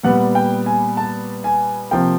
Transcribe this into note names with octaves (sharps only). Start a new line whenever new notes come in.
A#2 G3 B3 F#5
G5
G#5
A5
G#5
C3 F3 A#3 G5